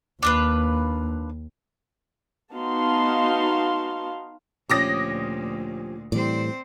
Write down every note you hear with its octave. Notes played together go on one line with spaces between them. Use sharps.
D#2 D4 F4 B4
B3 D#4 F#4 F5 A5 C6
D2 A#2 F3 C#4 G4 D6 D#6 A#6
A2 E3 G3 C4 C5 D5